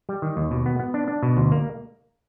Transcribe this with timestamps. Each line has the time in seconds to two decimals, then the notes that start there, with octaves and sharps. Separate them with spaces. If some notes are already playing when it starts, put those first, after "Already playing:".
0.09 G3
0.22 D#3
0.37 D#2
0.51 B2
0.66 B3
0.79 B3
0.94 D4
1.08 D4
1.23 B2
1.37 D2
1.52 A#3